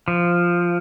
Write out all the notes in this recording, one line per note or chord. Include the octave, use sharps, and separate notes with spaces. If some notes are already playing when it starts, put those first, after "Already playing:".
F3